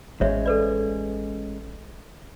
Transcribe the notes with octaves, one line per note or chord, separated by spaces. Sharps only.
A1 G#3 C#4 C#5 E5
A4 B4 D5